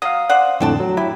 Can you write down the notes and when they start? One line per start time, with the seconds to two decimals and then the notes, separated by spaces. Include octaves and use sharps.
0.02 F#3 F5 D#6
0.29 C5 D5 F#5
0.60 F2 A2 D3 F#4 G5 A5
0.80 F#3
0.97 E4 G4